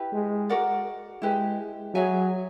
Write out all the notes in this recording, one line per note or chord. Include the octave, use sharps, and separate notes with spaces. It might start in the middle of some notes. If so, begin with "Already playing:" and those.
Already playing: E4 G4 B4
G#3
F#4 A#4 D5 F#5
G#3 E4 G4 B4
F#3 G#4 C#5 E5 G#5